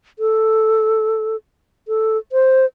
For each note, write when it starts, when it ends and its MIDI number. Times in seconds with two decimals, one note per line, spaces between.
0.19 1.36 69
1.88 2.17 69
2.32 2.66 72